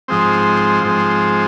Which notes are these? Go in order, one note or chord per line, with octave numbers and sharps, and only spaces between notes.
G#2 F3 G#3 C4
G#2 F3 G#3 C4